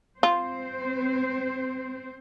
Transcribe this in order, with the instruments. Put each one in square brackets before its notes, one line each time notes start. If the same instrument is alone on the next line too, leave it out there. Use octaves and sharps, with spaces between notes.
[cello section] C4 C5 [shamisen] F4